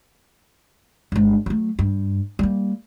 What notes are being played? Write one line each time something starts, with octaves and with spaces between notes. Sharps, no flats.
G1 G#3
F#3 A3
G2
G3 A#3